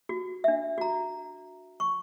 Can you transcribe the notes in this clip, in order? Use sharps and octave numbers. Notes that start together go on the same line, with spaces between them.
F#4
D4 E5
F#4 A#5
C#6